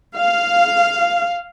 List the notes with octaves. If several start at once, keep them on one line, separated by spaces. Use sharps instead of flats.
F5